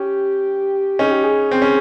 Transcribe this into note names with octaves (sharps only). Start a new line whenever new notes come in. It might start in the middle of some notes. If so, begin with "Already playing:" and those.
Already playing: C#4 G4
C#4 D#4 G#4
G4
G#4
C4
C#4